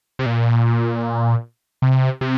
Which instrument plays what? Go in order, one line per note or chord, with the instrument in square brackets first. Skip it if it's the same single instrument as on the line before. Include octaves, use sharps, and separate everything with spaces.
[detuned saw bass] C3
A#2
C3
C3